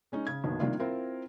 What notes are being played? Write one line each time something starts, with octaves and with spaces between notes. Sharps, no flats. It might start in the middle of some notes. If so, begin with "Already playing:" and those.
G#3 C#4 D#4
C#3 G#6
F#1 B1 B2 D#3
C3 D#3 G3 A#3 D4 F4
C4 E4 F4 A#4